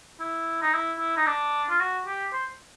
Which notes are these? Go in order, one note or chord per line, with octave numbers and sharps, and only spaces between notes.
E4
D#4
E4
E4
D#4
D4
F4
F#4
G4
C5